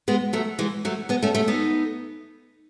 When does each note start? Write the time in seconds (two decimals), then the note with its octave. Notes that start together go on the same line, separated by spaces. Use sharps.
0.08 G#3 B3
0.33 F#3 A3
0.59 E3 G#3
0.85 F#3 A3
1.09 G#3 B3
1.23 A3 C#4
1.35 A3 C#4
1.48 B3 D#4